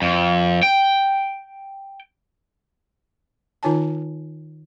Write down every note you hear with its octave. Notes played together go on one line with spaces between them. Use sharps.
F2
G5
D#3 D#4 F4 C#5 G#5 A5